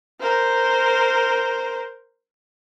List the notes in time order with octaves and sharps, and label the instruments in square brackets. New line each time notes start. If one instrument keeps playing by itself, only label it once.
[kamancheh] A#4 C5